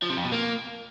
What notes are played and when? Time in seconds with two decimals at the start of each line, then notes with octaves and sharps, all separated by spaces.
0.03 F3
0.10 C3
0.17 F2
0.25 B2
0.32 A#3